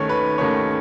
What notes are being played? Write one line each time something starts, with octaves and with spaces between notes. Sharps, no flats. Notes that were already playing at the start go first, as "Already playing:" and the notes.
Already playing: D#2 D#3 A3 C#4 C#5
B4
D#2 D#3 A3 C#4 C#5